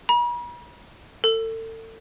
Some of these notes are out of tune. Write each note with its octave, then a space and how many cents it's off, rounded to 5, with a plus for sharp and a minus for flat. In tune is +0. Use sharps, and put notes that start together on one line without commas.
B5 -45
A4 +35